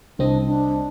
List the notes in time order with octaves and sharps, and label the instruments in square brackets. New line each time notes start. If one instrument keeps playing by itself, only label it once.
[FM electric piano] C2 C4 D#5 [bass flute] D4
[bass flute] D4